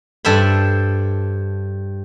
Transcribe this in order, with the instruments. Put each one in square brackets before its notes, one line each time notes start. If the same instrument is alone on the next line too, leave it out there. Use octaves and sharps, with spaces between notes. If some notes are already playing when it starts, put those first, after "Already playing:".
[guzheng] G2 A4 C5 E5 B5